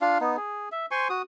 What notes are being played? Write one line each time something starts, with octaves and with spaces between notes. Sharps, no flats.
D4 F4 F5
B3 D#4
G#4
E5
C5 G#5 C6 C#6
F#4 D#6